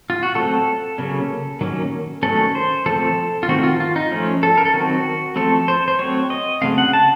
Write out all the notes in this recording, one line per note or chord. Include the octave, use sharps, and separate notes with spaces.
F4
F#4
F#3 A3 C4 A4
C#3 F#3 A#3 C#4
D#3 F#3 A#3 C#4
D#3 F#3 A3 C#4 A4
C5
F3 A3 C4 A4
F4
D#3 A3 C4 F#4
F4
F4
D#4
F3 A3 C#4
A4
A#4
A4
D#3 F#3 C4 F#4
F3 A3 C4 A4
C5
C5
F#3 A3 C4 C#5
D#5
C#3 F#3 A3 C4 F5
F#5
A5